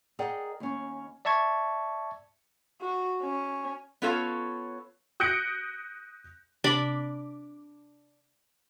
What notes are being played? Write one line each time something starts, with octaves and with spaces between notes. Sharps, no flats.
G#4 A#4 D5 D#5 F#5 G5
D#2 C#4
D5 E5 A5 C#6 G#6
F#4
C#4
B3 C#4 F4 A4 C#5 F5
D#6 F#6 G6 A#6 C#7 D7
C3 D4 D5 B5 D6